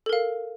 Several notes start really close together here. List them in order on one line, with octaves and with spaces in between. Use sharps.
A4 A#4 F5